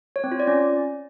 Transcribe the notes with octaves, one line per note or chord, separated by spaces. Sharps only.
C#5
C4
F4
D5
C#4